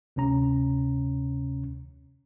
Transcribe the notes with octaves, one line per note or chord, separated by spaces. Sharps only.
D2 C3 C#4 A#5